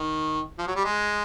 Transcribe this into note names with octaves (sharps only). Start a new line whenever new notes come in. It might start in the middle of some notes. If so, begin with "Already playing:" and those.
Already playing: D#3
F3
F#3
G3
G#3